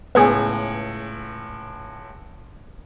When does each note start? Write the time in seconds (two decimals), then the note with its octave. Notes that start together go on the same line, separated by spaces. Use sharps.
0.15 C#2 A2 B3 G#4